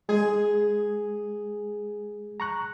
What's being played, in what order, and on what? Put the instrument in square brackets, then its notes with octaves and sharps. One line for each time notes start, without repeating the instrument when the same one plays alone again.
[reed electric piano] G#3 G#6 [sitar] G#4
[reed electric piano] A#5 C#6 F#6